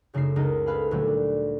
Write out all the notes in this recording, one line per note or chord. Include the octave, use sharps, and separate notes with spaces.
F#2 C#3 A3 D#4 E5 C7
C#2 D#4 A#4 D#5
A4 B4 F5 G#5 B5
D2 A#2 D3 F#3 G3 A3
D5